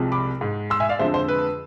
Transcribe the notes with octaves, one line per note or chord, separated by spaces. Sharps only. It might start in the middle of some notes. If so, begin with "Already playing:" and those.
Already playing: C2 C3 F3 G#3
B5 D6
G#2 G#3
C6 E6
E5 G#5
D5 F5
F2 D3 F3 G#3 C5 E5
C5
B4